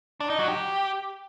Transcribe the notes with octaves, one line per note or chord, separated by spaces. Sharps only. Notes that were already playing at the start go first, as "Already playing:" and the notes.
D4
D#4
F#3
G4